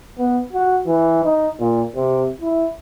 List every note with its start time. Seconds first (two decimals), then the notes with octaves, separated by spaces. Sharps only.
0.18 B3
0.53 F#4
0.86 E3
1.23 D#4
1.59 A#2
1.95 C3
2.41 E4